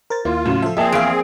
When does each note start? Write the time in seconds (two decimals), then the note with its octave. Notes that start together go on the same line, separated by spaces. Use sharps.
0.10 A#4 C5 A6
0.25 D#2 A#3 E4 F4
0.46 A2 C#3 F#3
0.62 F3 A4 E5
0.77 F3 A#3 C4 G#4 D5 E5 A5
0.92 E2 F5 D7